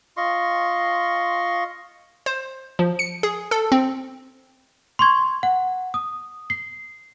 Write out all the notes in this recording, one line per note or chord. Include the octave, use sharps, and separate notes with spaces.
F4 D#5 C6 C#6
C5
F3
C#7
G#4
A4
C4
C6 C#6 G#6
F#5
D#6
C7